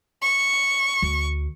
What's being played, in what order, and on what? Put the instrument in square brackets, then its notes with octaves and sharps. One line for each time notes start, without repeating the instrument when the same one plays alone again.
[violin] C#6
[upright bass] D2